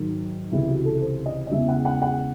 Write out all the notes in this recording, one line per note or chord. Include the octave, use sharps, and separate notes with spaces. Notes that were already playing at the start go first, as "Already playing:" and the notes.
Already playing: G#2 D#3 F#3
C#2 C3 E3 E4
F#4
A4
C5
D#5
D#5
E2 C#3 E3 G#3 E5
F#5
F#5
F#5